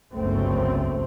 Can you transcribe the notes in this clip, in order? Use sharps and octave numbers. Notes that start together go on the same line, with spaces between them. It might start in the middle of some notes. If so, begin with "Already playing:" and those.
G1 C#2 F#2 A3 C4